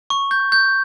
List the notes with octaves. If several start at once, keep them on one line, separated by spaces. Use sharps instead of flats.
C#6
G6
G6